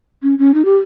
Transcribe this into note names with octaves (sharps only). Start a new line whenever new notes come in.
C#4
C#4
D#4
G4